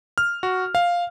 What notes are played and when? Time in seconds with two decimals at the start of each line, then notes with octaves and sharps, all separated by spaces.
0.18 F6
0.43 F#4
0.75 F5